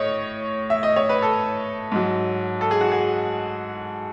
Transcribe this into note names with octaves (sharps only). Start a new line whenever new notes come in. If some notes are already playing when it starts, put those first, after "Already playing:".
Already playing: A2 C#5 D#5
E5
D#5
C#5
B4
A4
G#2 F#3
A4
G#4
F#4
G#4